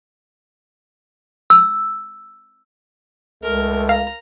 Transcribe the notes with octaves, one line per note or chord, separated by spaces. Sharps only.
E6
C#2 A3 A#4
F5 A#5